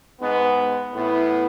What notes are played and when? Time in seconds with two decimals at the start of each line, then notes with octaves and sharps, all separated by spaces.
0.20 G#2 G#3 B3
0.93 A2 E3 B3 E4